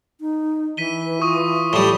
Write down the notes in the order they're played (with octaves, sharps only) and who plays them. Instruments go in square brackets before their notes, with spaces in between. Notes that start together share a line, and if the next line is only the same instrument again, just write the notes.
[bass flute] D#4
[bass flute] E3 [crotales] B6 D#7 G7
[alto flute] B4
[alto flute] F4 [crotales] C#6 D#6
[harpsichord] A2 G3 [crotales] G7